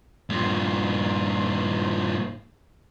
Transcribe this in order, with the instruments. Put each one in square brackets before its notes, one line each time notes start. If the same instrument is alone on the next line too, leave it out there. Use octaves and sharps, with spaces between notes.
[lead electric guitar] G2 A#2